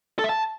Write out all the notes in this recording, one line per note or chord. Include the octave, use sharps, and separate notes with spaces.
A4
E5
A5